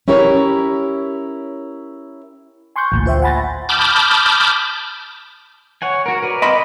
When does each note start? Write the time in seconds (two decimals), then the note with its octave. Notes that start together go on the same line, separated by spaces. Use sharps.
0.08 C#4 E4 G4 A#4 C#5
2.76 G#5 C6 C#6 F#6 G6
2.92 A1 D2 A#2
3.06 F4 C5 E5 G5
3.22 F#5 G#5 B5 A6 A#6
3.69 A5 B5 D6 D#6 F6 G6
5.82 C#5 F#5 G#5
6.06 F#4 A#4
6.22 A#4 B4 D5
6.42 D#5 B5 C6